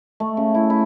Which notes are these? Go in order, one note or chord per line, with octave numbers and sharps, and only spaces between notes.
A3
C#3
E4
E4